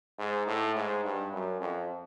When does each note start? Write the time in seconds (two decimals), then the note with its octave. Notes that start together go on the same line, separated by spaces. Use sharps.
0.18 G#2
0.47 A2
0.75 G#2
1.04 G2
1.32 F#2
1.60 F2